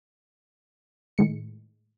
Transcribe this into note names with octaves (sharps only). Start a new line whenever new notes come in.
A2 D#3 G#3 C#7